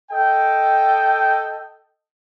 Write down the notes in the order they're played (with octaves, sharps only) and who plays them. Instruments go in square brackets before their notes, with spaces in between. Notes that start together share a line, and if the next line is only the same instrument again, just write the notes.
[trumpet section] A4 D#5 G5